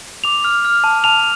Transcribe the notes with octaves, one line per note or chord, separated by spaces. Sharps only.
D6 F7
F6
F6
A5
A5 F7